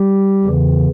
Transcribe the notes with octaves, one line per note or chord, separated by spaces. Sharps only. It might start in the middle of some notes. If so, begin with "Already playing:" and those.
Already playing: G3 G4
E2 C#3 E3